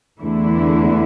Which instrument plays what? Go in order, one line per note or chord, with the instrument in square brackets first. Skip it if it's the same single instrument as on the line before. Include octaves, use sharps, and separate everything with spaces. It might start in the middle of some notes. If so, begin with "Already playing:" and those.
[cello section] E2 D3 A3 E4